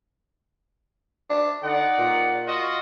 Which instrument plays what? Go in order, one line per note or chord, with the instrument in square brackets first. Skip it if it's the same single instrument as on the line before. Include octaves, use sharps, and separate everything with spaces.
[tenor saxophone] D4
[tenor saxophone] D3 [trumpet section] D#4 D5 F#5
[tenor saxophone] A#2
[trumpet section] F4 F#4 D#5